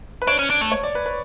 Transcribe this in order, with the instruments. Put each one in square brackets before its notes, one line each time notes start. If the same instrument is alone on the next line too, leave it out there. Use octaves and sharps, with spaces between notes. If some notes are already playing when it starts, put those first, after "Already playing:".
[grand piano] B4
[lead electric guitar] D4 [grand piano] C#5
[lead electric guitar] C#4
D4
A3
[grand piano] C#5
D5
B4
B4